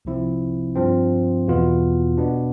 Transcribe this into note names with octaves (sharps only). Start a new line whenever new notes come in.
C2 C3 F3 C4 E4
G2 F3 C4
E2 B2 B3 F4
B2 B3 D4